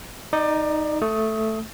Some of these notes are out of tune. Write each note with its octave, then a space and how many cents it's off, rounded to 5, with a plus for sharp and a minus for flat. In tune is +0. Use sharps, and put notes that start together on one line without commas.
D#4 +0 D5 +25
A3 +0 D#6 +25